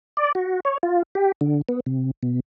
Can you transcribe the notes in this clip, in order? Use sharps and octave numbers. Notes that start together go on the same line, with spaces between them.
D5
F#4
C#5
F4
G4
D3
B3
C3
B2